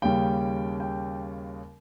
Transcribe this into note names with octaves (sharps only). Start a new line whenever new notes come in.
D#2 C#3 G3 C#4 G5
G5